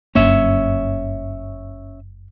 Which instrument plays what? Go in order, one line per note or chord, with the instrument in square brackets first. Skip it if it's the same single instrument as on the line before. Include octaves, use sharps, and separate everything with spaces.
[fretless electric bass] F#1 G2 A#3 [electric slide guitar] C#4 C#5 E5